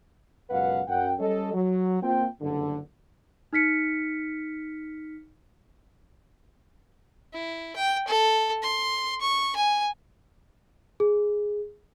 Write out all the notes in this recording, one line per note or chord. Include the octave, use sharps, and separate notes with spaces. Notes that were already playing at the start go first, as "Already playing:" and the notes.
C#2 F#2 B2 B4 F5 F#5
F#2 F#5 G5
G3 C#4 A4 D#5
F#3
A#3 C4 F4 G5
F#1 G2 D3
D#4 F6 B6 C#7
E4
G5
A4
C6
C#6
G#5
G#4